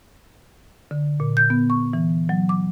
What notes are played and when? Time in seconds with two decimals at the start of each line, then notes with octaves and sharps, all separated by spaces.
0.91 D3
1.20 A#2
1.37 G6
1.50 B3
1.70 C#6
1.93 E3
2.29 F#3
2.49 D6